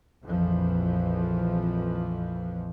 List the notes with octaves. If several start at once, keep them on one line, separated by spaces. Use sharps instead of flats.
A#1 F2 E3 F3